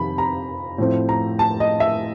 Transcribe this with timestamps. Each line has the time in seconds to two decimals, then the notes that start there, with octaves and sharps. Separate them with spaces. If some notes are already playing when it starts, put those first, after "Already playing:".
Already playing: F2 C3 D#3 B5
0.18 A#5
0.78 A2 F3 A3 C4
1.09 A#5
1.39 A5
1.60 D#5
1.80 E5